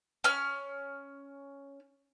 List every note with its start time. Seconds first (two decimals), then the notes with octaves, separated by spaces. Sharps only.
0.24 C#4 F6